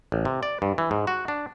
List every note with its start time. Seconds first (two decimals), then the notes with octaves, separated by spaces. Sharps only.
0.12 A1
0.25 C3
0.43 D5
0.62 G2
0.78 E3
0.91 G#2
1.07 F#4
1.28 D4